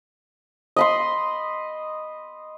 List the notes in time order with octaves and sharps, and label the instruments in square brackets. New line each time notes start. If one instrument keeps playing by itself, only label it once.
[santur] D#5 B5 C6